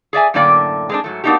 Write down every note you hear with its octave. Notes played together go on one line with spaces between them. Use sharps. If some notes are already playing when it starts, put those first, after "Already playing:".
G#4 D5 E5 G#5
F#2 A2 D3 A#3 D5 G5
G#3 C4 D4
G#2 F#3 A3
A#3 B3 D4 D#4 F#4 G4